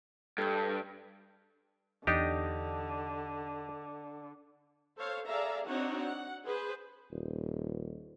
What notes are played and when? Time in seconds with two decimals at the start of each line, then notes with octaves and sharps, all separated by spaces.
0.38 G2 A4 G6
2.07 E2 D3 D4 D#4 G4 D#5
4.97 A4 C5 C#5 F5
5.27 G#4 A4 D5 E5 F5 A#5
5.67 C4 D4 D#4 F#4 C#5 F#5
6.01 F#5
6.45 G#4 B4 C5
7.11 D#1